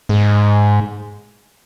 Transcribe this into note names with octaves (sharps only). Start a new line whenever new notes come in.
G#2